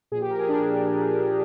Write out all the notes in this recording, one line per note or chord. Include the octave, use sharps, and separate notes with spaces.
A#2 F3 G#4
G4
A#4
G#4
D4